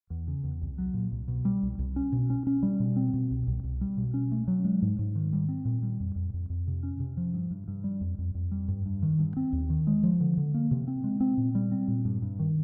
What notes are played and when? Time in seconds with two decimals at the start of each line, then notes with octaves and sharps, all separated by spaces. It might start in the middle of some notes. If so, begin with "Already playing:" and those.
0.10 E2
0.28 C#3
0.44 E2
0.62 C2
0.78 F#3
0.94 A#2
1.12 C2
1.28 B2
1.45 G3
1.63 C2
1.79 C2
1.96 C#4
2.12 B2
2.30 C#4
2.47 C#4
2.63 G3
2.80 B2
2.96 C4
3.14 B2
3.31 C2
3.47 C2
3.64 C2
3.81 G3
3.97 B2
4.14 C#4
4.32 A3
4.48 F#3
4.64 G#3
4.82 G#2
4.99 G#2
5.15 D#3
5.33 G3
5.48 C4
5.65 A#2
5.83 G3
6.00 F2
6.16 F2
6.34 F2
6.50 F2
6.67 C3
6.83 C#4
7.00 C3
7.17 F3
7.34 G2
7.51 G2
7.68 G2
7.84 G3
8.01 F2
8.18 F2
8.35 F2
8.52 G3
8.68 G2
8.86 G2
9.02 D#3
9.19 G2
9.37 C4
9.53 D#2
9.70 D#3
9.87 G#3
10.03 F3
10.20 D3
10.37 D3
10.54 A#3
10.71 C3
10.88 C4
11.04 G#3
11.20 C4
11.37 A#2
11.55 G3
11.72 C4
11.88 A#2
12.05 G2
12.22 G2
12.39 D#3